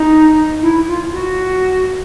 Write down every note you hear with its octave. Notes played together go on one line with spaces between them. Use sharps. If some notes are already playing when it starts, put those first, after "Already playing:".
Already playing: D#4
E4
F4
F#4